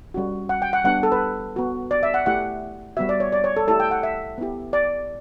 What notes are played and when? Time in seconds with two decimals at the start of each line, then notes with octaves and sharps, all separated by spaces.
0.14 G3 C#4 F#4
0.49 F#5
0.62 G5
0.73 F#5
0.85 G3 B3 D4 G4 F#5
1.03 A4
1.12 B4
1.56 B3 F#4
1.91 D5
2.03 E5
2.14 F#5
2.26 A3 E4 G4 F#5
2.97 G3 B3 F#4 E5
3.09 D5
3.20 C#5
3.32 D5
3.44 C#5
3.57 A4
3.67 A3 E4 G4 A4
3.80 G5
3.91 F#5
4.03 E5
4.38 B3 E4 G4
4.73 D5